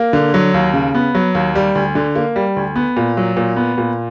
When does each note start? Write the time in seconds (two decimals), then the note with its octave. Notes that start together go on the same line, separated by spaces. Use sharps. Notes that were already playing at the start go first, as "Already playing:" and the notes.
Already playing: A#3
0.13 D3
0.34 F#3
0.54 D#2
0.74 C#3
0.95 B3
1.15 F#3
1.35 D#2
1.55 G3
1.75 D2
1.95 D3
2.16 A#3
2.36 G3
2.56 D2
2.76 B3
2.97 A#2
3.17 F#3
3.37 A#2
3.56 B3
3.78 A#2